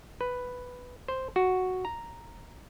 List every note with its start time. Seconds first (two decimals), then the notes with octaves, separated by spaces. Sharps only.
0.21 B4
1.08 C5
1.36 F#4
1.85 A#5